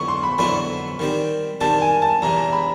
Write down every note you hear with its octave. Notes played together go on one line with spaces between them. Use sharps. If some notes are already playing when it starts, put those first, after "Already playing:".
Already playing: F2 D3 F#3 B3 E4 C#6
C6
B5
F2 D3 F#3 B3 E4 B5
D#3 G3 C4
D#3 G3 C4 A5
G#5
A5
E2 C3 E3 A#5
A#5
B5